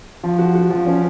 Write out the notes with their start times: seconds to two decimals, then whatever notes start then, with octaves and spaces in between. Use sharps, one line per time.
0.23 F3
0.38 F#4
0.55 F#4
0.70 F3
0.86 C#4